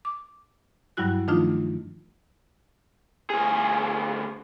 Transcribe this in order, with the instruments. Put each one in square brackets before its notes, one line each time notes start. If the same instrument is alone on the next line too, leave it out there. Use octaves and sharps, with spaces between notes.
[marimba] D6
G2 F#3 G3 E4 F#4 F#6
D#3 F3 A3 D4 D#4 F4
[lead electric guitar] D2 G#4